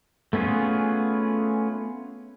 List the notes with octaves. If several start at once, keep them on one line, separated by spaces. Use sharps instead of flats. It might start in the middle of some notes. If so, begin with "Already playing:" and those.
A3 B3 C#4 F4 G#4